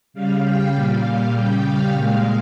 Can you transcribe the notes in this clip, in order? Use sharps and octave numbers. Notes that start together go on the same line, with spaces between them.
C#3 G3 F5
G5
A#2 G3 F5
C#3 G3 G5
F5
A#2 G#3 F5